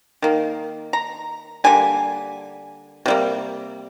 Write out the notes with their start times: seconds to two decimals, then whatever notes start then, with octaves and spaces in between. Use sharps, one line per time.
0.22 D#3 A#3
0.93 A#5
1.64 D3 G3 A#3 G#5
3.06 C3 G3 A#3